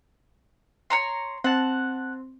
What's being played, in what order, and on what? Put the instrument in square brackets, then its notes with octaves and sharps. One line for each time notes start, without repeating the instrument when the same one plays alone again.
[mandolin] C#5 A#5 C6
[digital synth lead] C4 [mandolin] F#5 A5